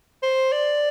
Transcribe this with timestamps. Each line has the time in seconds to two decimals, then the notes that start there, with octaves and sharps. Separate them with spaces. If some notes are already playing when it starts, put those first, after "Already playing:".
0.23 C5
0.52 D5